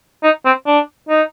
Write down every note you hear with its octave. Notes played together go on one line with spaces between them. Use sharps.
D#4
C4
D4
D#4